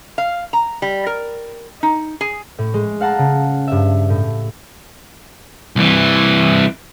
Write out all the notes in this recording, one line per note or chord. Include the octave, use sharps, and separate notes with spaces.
F5
A#5
G3
A#4
D#4
G#4
A2
G#3
F5 F#5 A5 A#5
C#3
G2 E5
A2
C2 E3